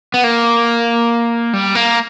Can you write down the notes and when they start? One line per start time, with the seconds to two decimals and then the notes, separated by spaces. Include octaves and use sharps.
0.14 B3
0.24 A#3
1.53 G3
1.75 A#3